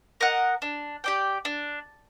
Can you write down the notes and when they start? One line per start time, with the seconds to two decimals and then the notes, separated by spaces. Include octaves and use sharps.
0.21 A#4 D#5 F#5
0.62 D4
1.04 G4 D5 G5
1.45 D4